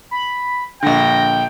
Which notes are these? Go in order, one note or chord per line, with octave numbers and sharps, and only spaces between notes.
B5
A#1 D3 G5 A#6